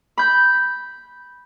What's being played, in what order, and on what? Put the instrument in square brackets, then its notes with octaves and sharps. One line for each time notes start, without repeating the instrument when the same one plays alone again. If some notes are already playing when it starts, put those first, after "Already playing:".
[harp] B5 G6